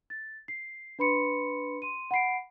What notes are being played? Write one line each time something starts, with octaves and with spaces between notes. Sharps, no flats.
A6
C7
D4 B4 B5 C6 C#7
C6 D#7
F#5 B5 C7 D7